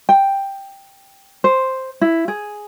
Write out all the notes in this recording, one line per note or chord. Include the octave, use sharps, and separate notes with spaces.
G5
C5
E4
G#4